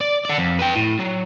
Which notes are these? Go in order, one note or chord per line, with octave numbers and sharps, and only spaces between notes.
D5
D5 F#5
F2
B4 G5
A2
F#3